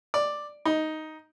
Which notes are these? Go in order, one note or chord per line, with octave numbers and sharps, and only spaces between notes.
D5
D#4